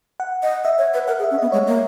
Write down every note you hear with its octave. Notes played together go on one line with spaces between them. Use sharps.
F#5
D#5
D#5 E5
C#5
B4
A#4 F#5
G#4
E5
C#4
B3 D#5
G#3 C#5
A#3